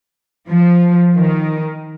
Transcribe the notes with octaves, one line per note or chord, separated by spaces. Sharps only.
F3
D#3